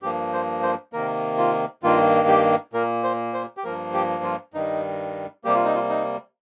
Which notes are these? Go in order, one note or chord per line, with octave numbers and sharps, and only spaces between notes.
G2 F3 A#3 G4
C5
C5
C3 D#3 A#3 A#4
F4
G2 D#3 A#3 F4
G4
A#2 A#3 A#4
C5
C5
G4
G2 F3 A#3 A#4
G4
F4
G2 D#3 G3 D#4
C3 G3 A#3 G4
F4
D#4
F4
D#4